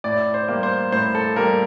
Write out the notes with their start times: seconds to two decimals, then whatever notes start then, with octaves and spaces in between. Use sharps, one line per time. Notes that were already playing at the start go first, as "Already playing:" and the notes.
0.04 A2 D5
0.34 C5
0.48 G3 A#3
0.63 C5
0.92 A2 C5
1.15 A4
1.36 G3 A#3 A#4